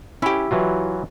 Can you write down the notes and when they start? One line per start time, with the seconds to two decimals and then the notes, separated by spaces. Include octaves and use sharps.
0.22 C#4 E4 G4
0.51 E3 F#3 F4